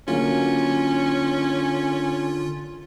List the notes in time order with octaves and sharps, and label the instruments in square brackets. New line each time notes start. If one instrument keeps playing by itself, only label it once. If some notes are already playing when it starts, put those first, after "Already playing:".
[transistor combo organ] D3 [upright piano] F#3 A#3 [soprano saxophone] C#4 [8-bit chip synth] F4